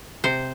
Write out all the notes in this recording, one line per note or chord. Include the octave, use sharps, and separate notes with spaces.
C3 C5